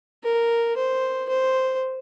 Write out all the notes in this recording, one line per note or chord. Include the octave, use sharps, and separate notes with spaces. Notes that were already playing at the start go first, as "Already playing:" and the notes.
A#4
C5
C5